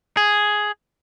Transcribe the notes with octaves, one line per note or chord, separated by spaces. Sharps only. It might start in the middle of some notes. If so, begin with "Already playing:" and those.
G#4